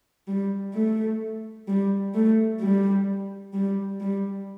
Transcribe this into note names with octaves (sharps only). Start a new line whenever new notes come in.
G3
A3
G3
A3
G3
G3
G3